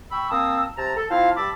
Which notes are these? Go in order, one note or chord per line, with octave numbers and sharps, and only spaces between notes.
G5 B5 C#6 E6
A#3 C4 A5 D#6 E6
C3 A5 A#5
A4
C4 E4 F4 F5 A5
G2 A5 B5 D6 E6